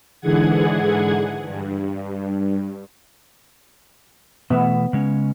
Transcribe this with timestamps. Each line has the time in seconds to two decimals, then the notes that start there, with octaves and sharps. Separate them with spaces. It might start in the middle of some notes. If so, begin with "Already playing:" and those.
0.21 G#2 D3 E3 G#4 F#5 G#6
1.44 G2
4.50 B2 E3 A3 B3
4.93 C#3 G#3 C#4